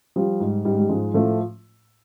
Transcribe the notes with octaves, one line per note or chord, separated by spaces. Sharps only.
F3 G3
G#2
G#2 G3
G3
G#2 F3 G#3
A2 F3 A3